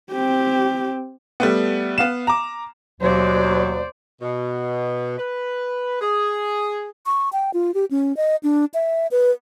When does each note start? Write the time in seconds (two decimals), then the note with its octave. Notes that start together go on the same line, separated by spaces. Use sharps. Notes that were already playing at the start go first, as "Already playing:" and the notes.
0.11 C4 G4
1.40 G3 A3 B3
1.98 B3 F5 E7
2.27 A#5 D6
3.01 D#2 B2 F#3 C5 D5
4.22 B2
5.17 B4
6.01 G#4
7.06 C#6
7.33 G5
7.54 F4
7.74 G4
7.91 C#4
8.17 D#5
8.43 D4
8.74 E5
9.11 B4